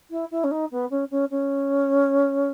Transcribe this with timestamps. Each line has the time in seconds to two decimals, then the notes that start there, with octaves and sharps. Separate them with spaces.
0.11 E4
0.31 E4
0.44 C#4
0.51 D#4
0.71 B3
0.90 C#4
1.11 C#4
1.31 C#4